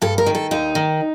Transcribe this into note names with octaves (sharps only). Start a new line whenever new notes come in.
G2 A4
A#4
D#3
A4
D#2 D#4
D#3